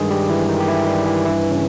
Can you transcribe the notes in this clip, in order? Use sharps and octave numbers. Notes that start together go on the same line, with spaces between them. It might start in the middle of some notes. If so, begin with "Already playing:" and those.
Already playing: G2 D#3 G#3 G#4
G3 G4
E3 E4
D#3 D#4
G4
E3 E4
G3 G4
E3 E4
G2 E3 E4
C#3 C#4